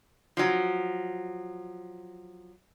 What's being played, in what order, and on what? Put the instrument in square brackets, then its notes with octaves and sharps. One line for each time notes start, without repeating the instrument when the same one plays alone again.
[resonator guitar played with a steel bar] F3 F#3